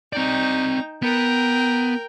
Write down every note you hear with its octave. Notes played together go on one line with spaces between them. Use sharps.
C4 D#4 D5 G5
B3 A#4 G5